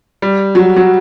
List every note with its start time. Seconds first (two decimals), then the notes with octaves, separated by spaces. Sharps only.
0.22 G3
0.55 F#3
0.76 F#3